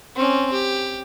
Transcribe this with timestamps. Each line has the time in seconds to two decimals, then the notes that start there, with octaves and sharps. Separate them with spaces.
0.16 C4 C#4
0.52 G4